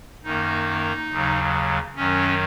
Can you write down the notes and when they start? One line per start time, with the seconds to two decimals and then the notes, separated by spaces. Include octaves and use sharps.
0.24 F#2 D#3 A#3 D#4
1.10 D#2 C#3 F#3
1.96 F#2 D#3 F#3 C#4